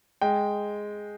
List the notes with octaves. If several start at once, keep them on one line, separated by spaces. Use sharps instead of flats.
G#3 G5